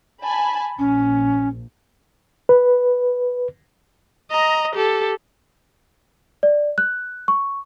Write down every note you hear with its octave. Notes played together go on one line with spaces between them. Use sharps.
G#5 A5 B5
A#1 C#4
B4
D#5 A#5
G4 A4
D5
F#6
C#6